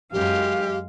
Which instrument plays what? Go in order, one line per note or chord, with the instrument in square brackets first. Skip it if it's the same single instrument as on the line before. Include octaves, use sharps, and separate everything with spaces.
[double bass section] F#2 [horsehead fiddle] G#3 F5 [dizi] G4